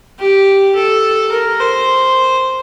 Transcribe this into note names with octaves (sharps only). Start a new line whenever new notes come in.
G4
A4
A#4
C5